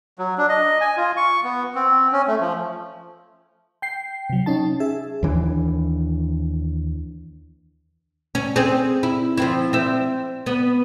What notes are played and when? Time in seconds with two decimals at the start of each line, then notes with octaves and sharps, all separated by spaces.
0.19 F#3
0.38 D4
0.49 D#5
0.81 G#5
0.97 F4
1.17 C#6
1.44 B3
1.75 C4
2.12 C#4
2.28 A3
2.41 F3
3.82 G5 C7
4.29 C3 F#3
4.46 C#4 D#4 A5
4.80 G#4 E5
5.23 D#2 E3 D4
8.35 C#4
8.56 C4 G#4
9.03 E4
9.37 F3 C4 E4
9.73 C4 E5
10.46 B3